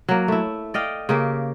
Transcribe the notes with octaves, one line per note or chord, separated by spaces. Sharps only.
F#3 A#3
A3 E4
D5 D#5 F5 G5
C#3 A#3 G4